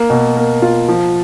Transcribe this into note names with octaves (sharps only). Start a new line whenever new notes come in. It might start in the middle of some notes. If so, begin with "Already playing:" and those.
Already playing: A#3
B2
A#3
F4
F3